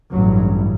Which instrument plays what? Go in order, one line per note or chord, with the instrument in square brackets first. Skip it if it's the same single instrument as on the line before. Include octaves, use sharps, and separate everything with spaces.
[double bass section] A1 G2 F#3